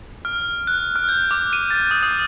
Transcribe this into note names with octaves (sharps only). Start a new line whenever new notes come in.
F6
F#6
F6
G6
D6
D#7
A6
D#6
D#6